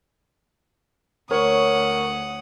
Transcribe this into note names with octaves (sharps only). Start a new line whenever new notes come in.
D2 A#4 C#5 F#5 C#6 D#6